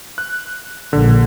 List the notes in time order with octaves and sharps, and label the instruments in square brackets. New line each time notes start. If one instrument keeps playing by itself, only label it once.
[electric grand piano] F#6
[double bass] A#1 [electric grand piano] D3